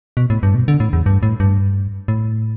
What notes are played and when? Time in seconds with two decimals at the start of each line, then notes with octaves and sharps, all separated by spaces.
0.17 B2
0.30 A2
0.43 G2
0.55 B2
0.68 D3
0.80 A2
0.93 E2
1.06 G2
1.23 A2
1.40 G2
2.08 A2